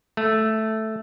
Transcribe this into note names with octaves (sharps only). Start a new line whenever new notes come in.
A3